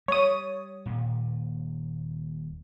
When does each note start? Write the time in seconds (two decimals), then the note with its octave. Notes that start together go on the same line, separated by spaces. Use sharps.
0.08 G3 C#5 D#6
0.86 D#1 A#2